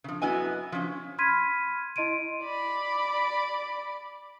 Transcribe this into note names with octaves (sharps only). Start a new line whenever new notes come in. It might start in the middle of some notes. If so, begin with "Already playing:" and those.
C#3 F3
F#2 B3 E4 F#4 D#5 G#5
F3 C#4
B5 C6 F6 G#6 B6 D#7
E4 D#5 C6 D7 D#7
D5 B5